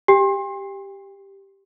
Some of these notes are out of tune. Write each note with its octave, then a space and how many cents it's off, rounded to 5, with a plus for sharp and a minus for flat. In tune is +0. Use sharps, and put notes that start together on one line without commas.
G4 +0 G5 +40